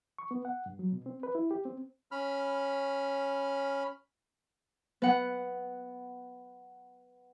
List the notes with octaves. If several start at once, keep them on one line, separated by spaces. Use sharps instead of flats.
C#6
B3
F#5
G2
F#3
B2
C4
B4
E4
G4
C4
C#4 B5 F6
B3 F#5